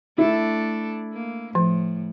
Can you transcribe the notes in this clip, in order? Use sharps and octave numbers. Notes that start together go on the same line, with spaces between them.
A3 D4 E4 A4
A#3
A2 F3